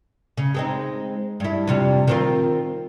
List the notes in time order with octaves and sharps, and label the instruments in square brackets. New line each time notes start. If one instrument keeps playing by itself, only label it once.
[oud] C#3
G#3 C4 D#4
G2 E4
F2 C3 G3
D#3 C4 F4